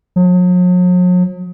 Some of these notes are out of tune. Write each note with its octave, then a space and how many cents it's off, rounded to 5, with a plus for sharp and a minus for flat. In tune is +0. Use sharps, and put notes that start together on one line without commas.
F#3 -45